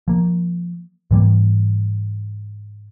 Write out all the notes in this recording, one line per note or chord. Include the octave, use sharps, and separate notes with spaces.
F3 A#3
G#2 E3 G3 A#3